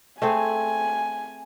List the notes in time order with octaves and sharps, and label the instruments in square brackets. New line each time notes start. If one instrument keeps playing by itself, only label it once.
[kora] A3 C4 G#4 [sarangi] G#5